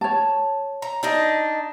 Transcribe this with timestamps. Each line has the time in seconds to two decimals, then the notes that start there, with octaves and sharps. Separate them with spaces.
0.01 C#5 A5
0.82 A#5
1.03 D4 D#4 D#5